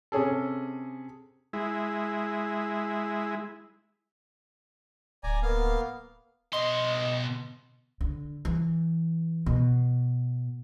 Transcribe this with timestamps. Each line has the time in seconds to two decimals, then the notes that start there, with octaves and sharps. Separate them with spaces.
0.12 C3 C#4 G#4 A4
1.53 G#3 E4
5.23 D1 D5 G#5 A#5
5.43 A#3 B3 F5
6.53 B2 D#5 C6
8.01 D3
8.45 E3
9.46 B2